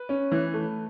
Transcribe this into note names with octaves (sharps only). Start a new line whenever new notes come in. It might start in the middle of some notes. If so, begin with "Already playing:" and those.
Already playing: B4
C#4
E3
A3